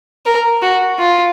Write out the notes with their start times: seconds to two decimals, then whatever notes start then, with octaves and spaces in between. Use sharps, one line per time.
0.26 A#4
0.62 F#4
0.99 F4